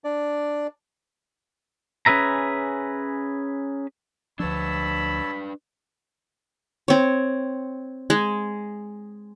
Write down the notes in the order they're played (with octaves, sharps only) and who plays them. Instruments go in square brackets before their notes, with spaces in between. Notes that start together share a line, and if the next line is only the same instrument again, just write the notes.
[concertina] D4 D5
[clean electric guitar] C#4 G#4 B4 E5 A#5
[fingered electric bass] D2 F3 [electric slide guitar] D4 B4 [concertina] C#5 A5 E6 [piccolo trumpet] B5
[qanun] C4 C#5
G#3